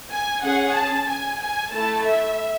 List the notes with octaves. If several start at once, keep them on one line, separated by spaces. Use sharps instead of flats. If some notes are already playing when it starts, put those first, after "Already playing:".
G#5
C#4 G#4 F#5
A5
G#5
G#5
A3 E4 A4 A5
E5